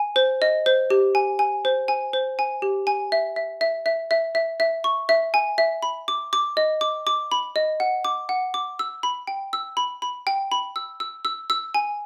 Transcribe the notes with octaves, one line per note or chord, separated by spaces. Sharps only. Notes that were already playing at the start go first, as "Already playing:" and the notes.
Already playing: G#5
C5
D#5
C5
G4
G#5
G#5
C5
G#5
C5
G#5
G4
G#5
E5
E5
E5
E5
E5
E5
E5
C#6
E5
G#5
E5
B5
D6
D6
D#5
D6
D6
B5
D#5
F#5
D6
F#5
D6
E6
B5
G5
E6
B5
B5
G5
B5
E6
E6
E6
E6
G#5